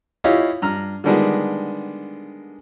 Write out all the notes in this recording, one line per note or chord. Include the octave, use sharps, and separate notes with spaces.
E4 F4 G4 C#5 D#5 F5
G2 A#5 F6
D3 D#3 G3 G#3 B3 D4